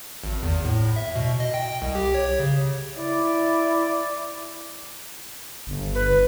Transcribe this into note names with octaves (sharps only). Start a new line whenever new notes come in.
G#1
E2
A2
E5
B2
D#5
G5
C2
G4
C#5
C#3
E4 D5
G1
B4